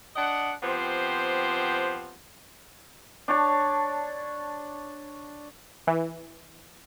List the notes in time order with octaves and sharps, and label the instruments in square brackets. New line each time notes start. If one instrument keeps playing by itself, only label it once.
[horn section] D4 D5 D#5 F#5
F3 B3 C4 G4 C5
[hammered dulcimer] D4 C#5 A5
[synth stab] E3